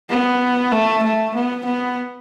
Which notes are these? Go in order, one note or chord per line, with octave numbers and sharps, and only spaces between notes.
B3
A3
A3
B3
B3